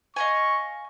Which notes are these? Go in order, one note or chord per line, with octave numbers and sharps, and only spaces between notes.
D#5 F5 G#5 C#6